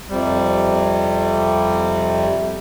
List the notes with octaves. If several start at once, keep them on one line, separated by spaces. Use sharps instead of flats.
F2 C3 G3